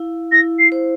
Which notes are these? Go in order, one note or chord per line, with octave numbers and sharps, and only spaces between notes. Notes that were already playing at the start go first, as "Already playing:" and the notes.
Already playing: E4 F5
E4 A#6
C7
C5